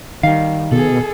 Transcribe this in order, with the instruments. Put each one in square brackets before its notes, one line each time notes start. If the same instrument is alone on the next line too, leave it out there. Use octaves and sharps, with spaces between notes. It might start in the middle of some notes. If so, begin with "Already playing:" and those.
[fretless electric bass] D#3 [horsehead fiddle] G3 [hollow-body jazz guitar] F5
[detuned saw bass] B2 [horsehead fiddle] G#4 A4